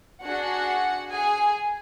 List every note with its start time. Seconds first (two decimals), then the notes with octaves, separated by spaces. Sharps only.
0.24 D4 F#4 G#4 F#5
1.11 G#4 G#5